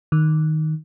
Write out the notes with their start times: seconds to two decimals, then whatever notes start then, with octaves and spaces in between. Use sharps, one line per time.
0.12 D#3